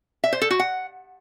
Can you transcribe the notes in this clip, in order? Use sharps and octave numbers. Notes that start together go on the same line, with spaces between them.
E5
C5
A4
F#4
F#5